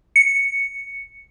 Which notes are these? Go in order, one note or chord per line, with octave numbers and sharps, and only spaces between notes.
C#7